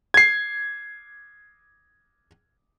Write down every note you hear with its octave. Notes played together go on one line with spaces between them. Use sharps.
G#6 C7